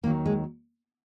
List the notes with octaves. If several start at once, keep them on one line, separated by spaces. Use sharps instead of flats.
D#2 D#3 F#3 A#3
G#3